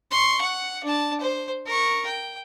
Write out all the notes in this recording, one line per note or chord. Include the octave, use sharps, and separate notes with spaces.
C6 C#6
F#5
D4 A5
C5
A#4 C#6
G5